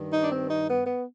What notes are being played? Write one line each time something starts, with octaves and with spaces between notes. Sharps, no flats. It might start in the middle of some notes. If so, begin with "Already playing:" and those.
Already playing: G2 D#3
D#4
D4
C4
D#4
B3
B3